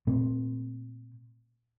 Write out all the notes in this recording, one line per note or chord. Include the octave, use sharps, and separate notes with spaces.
A#2 A3 C4